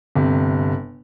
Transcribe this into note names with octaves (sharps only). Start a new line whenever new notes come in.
G1 C3